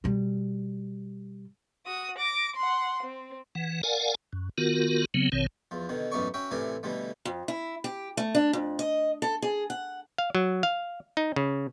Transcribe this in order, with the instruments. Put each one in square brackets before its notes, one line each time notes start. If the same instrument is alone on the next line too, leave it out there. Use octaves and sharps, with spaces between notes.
[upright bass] B2 G3
[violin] F#4 D#6
D6 A#6
F#5 C6
C4
[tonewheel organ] E3 F#5
A#4 D5 F5 F#5 G#5
F#2
D#3 B3 F4 F#4 A#4
C#3 F#3 B3 C4
A1 B2 D#3 C4 C#5
[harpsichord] E2 F3
B2 D3 D#3
A1 F#2 B3 D#4 D5 C#6
C#4 F#4 E5 G5
A2 C3 E3 A#4 D5 G#5
B2 D3 E3 G3 A3
[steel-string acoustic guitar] F2
E4
G4
A3
D4
F2
D#5
A4
G#4
F#5
[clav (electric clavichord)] F5
F#3
F5
D#4
C#3